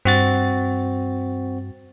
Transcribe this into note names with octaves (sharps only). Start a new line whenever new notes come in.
G2 C4 F#4 A6